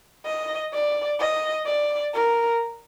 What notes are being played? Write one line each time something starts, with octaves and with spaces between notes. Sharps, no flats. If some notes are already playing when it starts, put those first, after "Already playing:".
D#5
D5
D#5
D5
A#4